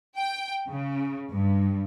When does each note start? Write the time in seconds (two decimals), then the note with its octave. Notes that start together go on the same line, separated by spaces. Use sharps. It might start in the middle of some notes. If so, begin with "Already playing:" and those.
0.19 G5
0.69 C#3
1.30 G2